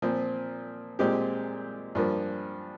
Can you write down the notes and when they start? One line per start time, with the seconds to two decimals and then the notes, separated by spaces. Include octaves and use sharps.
0.02 A#2 F3 C4
0.99 A#2 G#3 C4 G4
1.95 G2 F3 A#3